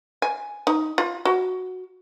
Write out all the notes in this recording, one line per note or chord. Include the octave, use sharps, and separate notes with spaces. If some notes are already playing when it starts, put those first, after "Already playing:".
G#5
D#4
F4
F#4